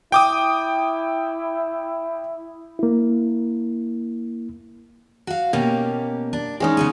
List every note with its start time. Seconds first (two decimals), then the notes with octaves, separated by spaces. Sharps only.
0.12 E4 G5 D6 D#6
2.79 A#3 E4
5.27 F#4 F5
5.53 B2 A#3 C#4 G4
6.33 D4
6.60 E3 G#3 C#4 D#4
6.77 C#3 B3 G#4